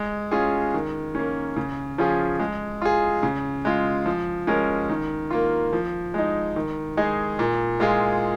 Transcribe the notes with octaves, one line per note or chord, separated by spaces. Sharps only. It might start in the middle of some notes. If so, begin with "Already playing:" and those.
Already playing: G#3
C#4 F4 G#4
D#3
A#3 C#4
C#3
F3 C#4 F4 G#4
G#3
F4 G#4
C#3
G#3 F4
F3
G#3 C#4 A#4
D#3
A#3 F4
F3
G#3 D#4
D#3
G#3 D#4 G#4
A#2
G#3 F4 G#4